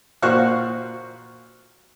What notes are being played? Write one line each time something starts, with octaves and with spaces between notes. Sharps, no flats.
A#2 F#4 C5 F5 C#6 F#6